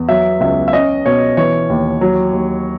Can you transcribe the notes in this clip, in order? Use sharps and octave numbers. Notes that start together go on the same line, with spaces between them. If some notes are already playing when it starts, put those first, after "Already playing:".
Already playing: E2
F#3 E5
C#2 E5
E5
C#4 D#5
B2 C#5
E3 C#5
D#2
F#3
D#2